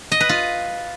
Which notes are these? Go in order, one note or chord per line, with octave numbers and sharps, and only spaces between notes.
D#5
B4
F4